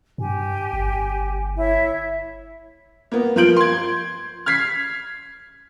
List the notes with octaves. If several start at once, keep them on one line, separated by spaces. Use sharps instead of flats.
G2 G4 G#5
G1
E4 C#5 E5
A#3 B3
F3 F4 A#4 G6 D7 F#7
C6 G#6
F6 G#6 B6 C7